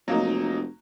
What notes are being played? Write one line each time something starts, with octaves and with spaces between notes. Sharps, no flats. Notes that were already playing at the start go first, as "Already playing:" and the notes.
F1 F#3 A#3 D#4